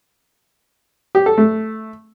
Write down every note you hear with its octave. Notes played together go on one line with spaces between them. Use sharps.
G4
A4
A3